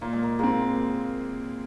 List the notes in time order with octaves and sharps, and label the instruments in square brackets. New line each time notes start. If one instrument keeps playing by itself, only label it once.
[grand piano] A#2 [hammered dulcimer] A#3
[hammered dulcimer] G#3
A#3
[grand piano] G#3 C4 [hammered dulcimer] A#3